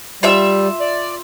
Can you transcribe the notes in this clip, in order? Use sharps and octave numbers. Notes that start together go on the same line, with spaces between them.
G3 F4 E5 E6
D5